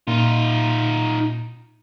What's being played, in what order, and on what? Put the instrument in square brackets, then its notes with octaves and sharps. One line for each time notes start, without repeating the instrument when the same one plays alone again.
[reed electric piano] A#2 [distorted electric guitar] D#4 F4